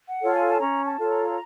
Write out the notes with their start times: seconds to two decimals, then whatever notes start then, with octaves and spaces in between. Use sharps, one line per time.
0.09 F#5
0.22 F4 A4 C#5
0.35 G#5
0.49 A5
0.59 C#4 A#5
0.85 A5
0.98 F4 A4 C#5
1.11 A#5